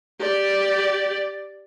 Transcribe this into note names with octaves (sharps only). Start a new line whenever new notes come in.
G4 D5